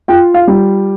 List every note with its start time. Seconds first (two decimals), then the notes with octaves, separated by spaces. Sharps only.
0.08 F4 G5
0.34 F5
0.47 G3